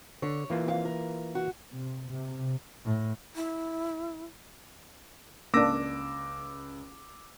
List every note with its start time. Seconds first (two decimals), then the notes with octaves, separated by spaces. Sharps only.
0.22 D3 C#5
0.50 E3 A#3 F4
0.66 F2 G4 F5
0.85 A#4
1.35 F#4
1.72 C3
2.09 C3
2.85 A2
3.36 E4
5.54 C#2 A#3 D4 D6 E6 A#6